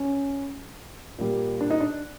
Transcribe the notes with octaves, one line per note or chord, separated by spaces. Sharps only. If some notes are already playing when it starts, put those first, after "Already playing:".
Already playing: C#4
A#2 G3
D4
D#4
D4